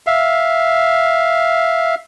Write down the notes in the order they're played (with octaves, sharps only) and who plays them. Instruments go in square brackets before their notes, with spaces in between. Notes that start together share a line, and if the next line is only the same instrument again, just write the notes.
[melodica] E5 F5